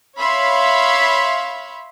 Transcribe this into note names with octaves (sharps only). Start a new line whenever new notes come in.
C#5 E5 F5 B5 C6